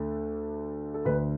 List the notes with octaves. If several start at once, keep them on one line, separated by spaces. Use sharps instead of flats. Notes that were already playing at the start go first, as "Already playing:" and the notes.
Already playing: D2 D3 A3
A4
D2 D3 A3 B4